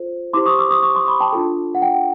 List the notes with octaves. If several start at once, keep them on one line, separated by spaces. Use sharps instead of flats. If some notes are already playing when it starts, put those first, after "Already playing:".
Already playing: F4 A4 C5
E4 G4 C5 C6 D6
C#6 D#6
D6 E6
C#6 D#6
C#6 D#6
C6 D6
B5 C#6
G5 A5
D4 F4 A4
F#5
G5